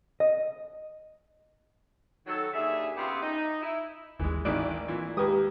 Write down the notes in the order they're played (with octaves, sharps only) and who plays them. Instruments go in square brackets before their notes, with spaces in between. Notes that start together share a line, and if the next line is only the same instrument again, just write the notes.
[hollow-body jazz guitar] D#5
[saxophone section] D#3 F#3 A4
D#2 D3 G#4 E5
C#3 B3 F4 G4 G#4 E5
D#4
E4
[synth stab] G#1 D#2 [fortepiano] E3 G#3
[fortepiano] G#1 D#3 E3 [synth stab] A2 D5 D7
[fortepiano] A#2 E3
[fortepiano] D#2 D#6 [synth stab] G#3 G4 B4